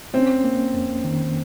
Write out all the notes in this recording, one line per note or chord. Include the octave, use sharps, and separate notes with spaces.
C4 C#4
A#3
F2
D#3